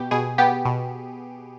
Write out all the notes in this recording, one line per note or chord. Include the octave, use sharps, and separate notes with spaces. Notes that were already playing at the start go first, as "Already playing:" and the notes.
Already playing: B2 G4
B2 G#4
B3 G4
B2